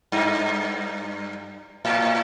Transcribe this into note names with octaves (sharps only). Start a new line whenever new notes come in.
G2
A2